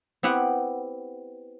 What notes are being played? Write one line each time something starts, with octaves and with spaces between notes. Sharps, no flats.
B3 C4 E4 G4 F#5